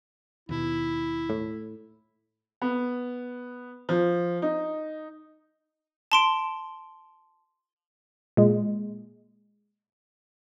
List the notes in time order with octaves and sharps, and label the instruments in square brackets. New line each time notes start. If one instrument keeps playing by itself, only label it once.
[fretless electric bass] D#2 B2 [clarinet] E4
[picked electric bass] A2
[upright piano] B3
F3
D#4
[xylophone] A5 C6 D7
[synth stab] A#2 G#3